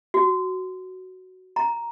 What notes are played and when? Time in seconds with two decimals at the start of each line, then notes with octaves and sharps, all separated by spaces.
0.14 F#4
1.56 A#5